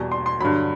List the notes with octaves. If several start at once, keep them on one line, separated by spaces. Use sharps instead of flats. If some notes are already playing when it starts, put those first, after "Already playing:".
Already playing: E2 B2 G3
C6
C6
G2 D3 F#3 B5